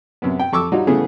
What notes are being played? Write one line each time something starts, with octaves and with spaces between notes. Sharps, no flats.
F#2 C3 B3
G5
F2 A4 C#6 D6 E6
F#3 G3 D#4 F4 F#4
C#3 E3 A3 B3 G#4